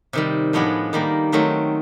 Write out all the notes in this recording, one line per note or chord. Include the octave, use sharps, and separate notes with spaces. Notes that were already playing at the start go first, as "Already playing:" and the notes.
C3 D#3 G3
A2 F3 G#3 B3 D4
D#3 G3 A#3
D#3 F#3 A3 C4